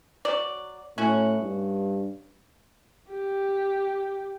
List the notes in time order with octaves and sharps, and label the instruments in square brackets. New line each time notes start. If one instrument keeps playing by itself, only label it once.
[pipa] F#3 D5
[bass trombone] A2 [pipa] C#4 F#4
[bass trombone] G2
[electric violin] G4